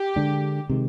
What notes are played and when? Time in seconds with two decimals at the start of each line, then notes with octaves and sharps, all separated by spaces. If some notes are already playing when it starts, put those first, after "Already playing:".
Already playing: G4
0.16 D3 G#3 D4
0.69 C3 D#3 G#3